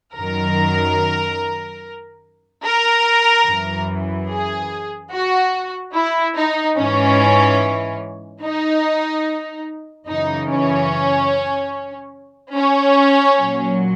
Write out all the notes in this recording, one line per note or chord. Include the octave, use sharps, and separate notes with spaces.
F#2 D#3 F#3 A#4
A#4
F#2 E3
G#4
F#4
E4
D#4
G#2 E3 C#4
D#4
F#2 C#3 E3 D#4
C#4
C#4
A#2 F#3